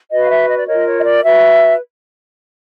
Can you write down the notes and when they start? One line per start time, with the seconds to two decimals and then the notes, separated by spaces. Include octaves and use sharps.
0.10 F#4 B4 D#5
0.21 F5
0.29 E5
0.48 D#5
0.58 D5
0.67 F4 A#4 C#5 D#5
0.86 C#5
0.99 D#5
1.04 D5
1.23 F#4 B4 E5